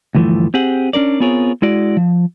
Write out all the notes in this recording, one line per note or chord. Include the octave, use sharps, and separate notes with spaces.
D2 G2 E3 F3 A3
C4 G4 G#4 F#5
C#4 D4 A#4 D5
B3 C4 F4 G#4 A#4 C#5
G#3 E4 F#4 D5
F3